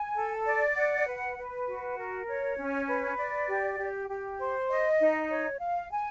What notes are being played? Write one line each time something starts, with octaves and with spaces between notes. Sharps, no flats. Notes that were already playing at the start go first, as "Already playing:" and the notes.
Already playing: G#5
A4
D5
F#5
B4
B4
F#4
A#4
C#5
C#4
B4
D5
G4
G4
G4
C5
D#5
D#4
C#5
F5
G#5